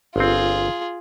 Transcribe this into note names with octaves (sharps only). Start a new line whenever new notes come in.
G1 C4 F4 G#4